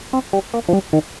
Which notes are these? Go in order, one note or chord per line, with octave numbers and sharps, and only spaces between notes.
C4
G3
A#3
F3
G3
D#3